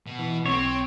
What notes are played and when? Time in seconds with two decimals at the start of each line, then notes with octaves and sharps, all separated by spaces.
0.06 B2
0.19 E3
0.46 B1 C4 C#5